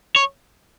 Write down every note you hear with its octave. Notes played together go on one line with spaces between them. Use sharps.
C#5